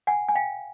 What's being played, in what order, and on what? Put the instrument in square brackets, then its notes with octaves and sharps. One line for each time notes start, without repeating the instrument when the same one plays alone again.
[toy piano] F#5 G#5
G#5
F5 G5